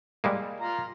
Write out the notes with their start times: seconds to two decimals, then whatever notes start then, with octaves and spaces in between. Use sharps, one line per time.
0.24 G3 G#3 A#3
0.60 F4 A#5